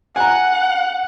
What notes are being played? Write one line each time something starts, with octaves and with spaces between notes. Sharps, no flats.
F#5 G#5 A#5